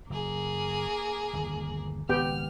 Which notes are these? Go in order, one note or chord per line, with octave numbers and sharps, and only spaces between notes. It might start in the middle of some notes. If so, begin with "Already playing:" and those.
F#1 A#3 G#4
G1 D#2
G#1 C#2 D#3 B3 G4 G5 F6